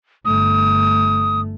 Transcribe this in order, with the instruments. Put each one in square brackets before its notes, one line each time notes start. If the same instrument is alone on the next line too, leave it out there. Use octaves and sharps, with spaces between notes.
[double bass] G1 A3 [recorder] D#6